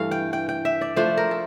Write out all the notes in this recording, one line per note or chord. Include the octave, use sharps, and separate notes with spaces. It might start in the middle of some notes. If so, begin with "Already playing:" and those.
Already playing: G2 E3 A3 F5
G5
G5
G5
E5
D5
F3 A3 D4 C5
A#4
A4